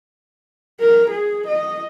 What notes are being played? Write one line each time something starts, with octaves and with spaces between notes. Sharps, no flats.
A#4
G#4
D#5